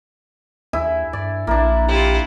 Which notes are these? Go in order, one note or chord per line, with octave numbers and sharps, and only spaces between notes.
D#2 E4 E5 G#5
G2 D5
A#1 A#3 D4 E4
E4 F4 G4